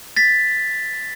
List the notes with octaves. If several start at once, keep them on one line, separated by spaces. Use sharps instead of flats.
A6 B6